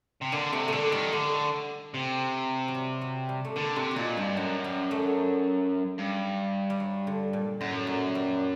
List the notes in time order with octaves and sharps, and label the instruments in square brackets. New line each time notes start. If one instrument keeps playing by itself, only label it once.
[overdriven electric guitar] C3
[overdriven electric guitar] D3 [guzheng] A#3
[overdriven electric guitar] C3 [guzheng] A3
[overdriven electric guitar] D3 [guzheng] G3 A3
[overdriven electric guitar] D#3 [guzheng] G3
[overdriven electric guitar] D3 [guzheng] A3
[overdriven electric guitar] C3
[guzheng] F#3
G3
F#3
G3
A3
[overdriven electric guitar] D3 [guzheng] A#3
[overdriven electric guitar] C3 [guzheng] D4
[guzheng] F#4
[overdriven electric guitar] A#2 [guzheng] D#4
[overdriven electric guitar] G2 [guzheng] G4
[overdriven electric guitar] F#2 [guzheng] F#4
[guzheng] G3
A3
[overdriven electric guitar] G2
[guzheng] G3
F#3
D3
A#2
[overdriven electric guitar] F#2 [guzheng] A2
[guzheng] A#2
G3